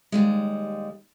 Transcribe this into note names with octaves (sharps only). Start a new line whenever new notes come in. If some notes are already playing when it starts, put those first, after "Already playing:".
D#2 G3 G#3